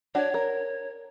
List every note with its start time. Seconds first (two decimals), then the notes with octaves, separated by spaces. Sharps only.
0.15 D4 F#4 C#5
0.34 A#4